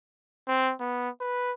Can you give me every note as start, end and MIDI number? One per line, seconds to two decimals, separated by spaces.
0.48 0.73 60
0.80 1.09 59
1.21 1.52 71